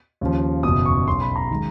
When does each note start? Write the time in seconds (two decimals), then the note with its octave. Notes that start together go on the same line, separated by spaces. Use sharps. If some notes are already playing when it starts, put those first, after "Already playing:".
0.21 D#2 C#3 F3
0.63 F#1 E2 B2 D#6
0.86 C#6
1.07 B1 B2 F#3 C6
1.21 B5
1.36 A#5
1.51 D#3 G#3